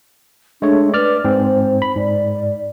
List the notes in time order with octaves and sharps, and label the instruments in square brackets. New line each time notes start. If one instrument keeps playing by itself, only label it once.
[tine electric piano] G#3 A3 C#5 [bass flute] D4
[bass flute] B4 [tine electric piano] D5 F6
[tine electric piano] G#2 C4 [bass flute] C5
[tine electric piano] B5
[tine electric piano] G#2 [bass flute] D5